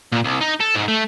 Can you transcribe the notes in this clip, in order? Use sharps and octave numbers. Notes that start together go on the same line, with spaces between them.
A#2
C2
D#4
A4
G#2
A3